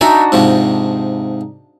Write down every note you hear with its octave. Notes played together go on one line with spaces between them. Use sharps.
D4 D#4 F#4 E5 G#5
G#2 C3 F3